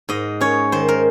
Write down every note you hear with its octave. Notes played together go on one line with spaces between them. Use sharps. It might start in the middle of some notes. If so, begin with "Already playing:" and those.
G#2 D#5
C#4 C#5
D#3 C5
A#4